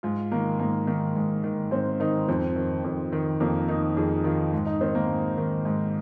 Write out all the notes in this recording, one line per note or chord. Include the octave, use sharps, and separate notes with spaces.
G#2 F4
D#3 A#3
G#2 A#3
D#3 A#3
G#2
D#3
G#2 C4
D#3 D#4
F2 C4
D#3
F2
D#3
F2 A#3
D#3 D#4
F2 G#4
D#3 F4
G#2
D#4
D#3 C4
A#3
G#2
D#3
G#2